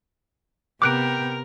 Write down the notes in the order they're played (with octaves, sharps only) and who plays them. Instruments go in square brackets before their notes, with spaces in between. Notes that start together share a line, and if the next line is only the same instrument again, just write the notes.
[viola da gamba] C3 B3 [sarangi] A#4 [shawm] G5 [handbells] D6 F#6 D7